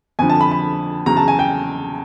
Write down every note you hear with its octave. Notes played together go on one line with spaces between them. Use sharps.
F2 D3 F3 G#5
A5
B5
B5
E2 C#3 F#3 A#5
A5
G#5
G5